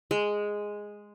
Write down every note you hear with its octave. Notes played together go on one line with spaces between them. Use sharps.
G#3